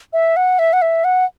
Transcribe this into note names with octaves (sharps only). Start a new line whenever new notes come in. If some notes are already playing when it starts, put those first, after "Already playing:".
E5
F#5
E5
F#5
E5
F#5